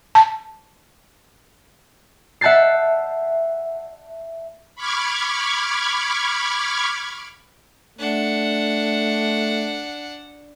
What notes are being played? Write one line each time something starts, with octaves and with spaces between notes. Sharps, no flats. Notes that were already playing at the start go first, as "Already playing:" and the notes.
A5
E5 F#5 A5 G6 A6 C7
B5 C#6 D6 F6 G#6
A3 D4 F#5